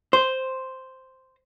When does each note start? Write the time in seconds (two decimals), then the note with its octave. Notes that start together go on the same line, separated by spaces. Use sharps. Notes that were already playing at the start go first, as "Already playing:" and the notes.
0.13 C5